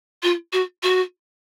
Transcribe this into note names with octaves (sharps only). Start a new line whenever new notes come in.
F4
F#4
F#4